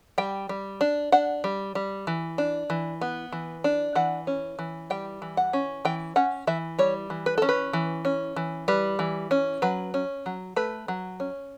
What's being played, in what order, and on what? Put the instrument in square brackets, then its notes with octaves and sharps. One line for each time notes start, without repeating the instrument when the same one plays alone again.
[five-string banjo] G3 G5
G3
D4
D4 F#5
G3
G3
E3
D4
E3
B3
E3
D4
E3 F#5
C#4
E3
G3 G5
E3
F#5
C#4
E3 G5
C#4 F#5
E3 E5
G3 C#5
E3
B4
C#4 A4
B4
E3
C#4
E3
G3 B4
E3
C#4
F#3 B4
C#4
F#3
A3 B4
F#3
C#4